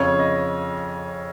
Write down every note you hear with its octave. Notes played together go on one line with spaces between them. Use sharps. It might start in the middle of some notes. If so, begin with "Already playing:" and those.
Already playing: F2 C#3 C#5
D#5